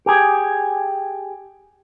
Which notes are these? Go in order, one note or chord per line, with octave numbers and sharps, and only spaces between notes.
G4 G#4